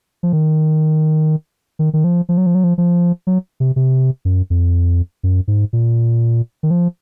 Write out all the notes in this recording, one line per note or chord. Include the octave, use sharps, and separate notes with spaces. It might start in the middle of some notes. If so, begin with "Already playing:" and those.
F3
D#3
D#3
D#3
F3
F3
F#3
F3
F#3
F3
F3
F#3
C3
C3
F#2
F2
F#2
G#2
A#2
D#3
F3